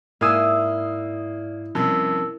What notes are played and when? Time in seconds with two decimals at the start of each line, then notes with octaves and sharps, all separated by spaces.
0.21 G#2 A#3 E4 D5 F5 G#5 D#6 E6
1.75 G2 C3 F3 C#4 A#4 A5 E6